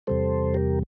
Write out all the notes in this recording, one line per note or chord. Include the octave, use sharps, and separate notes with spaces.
E2 C3 G3 A4 C5
G4 A#4